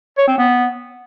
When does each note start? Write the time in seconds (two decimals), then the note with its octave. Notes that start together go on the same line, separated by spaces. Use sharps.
0.18 C#5
0.28 C4
0.38 B3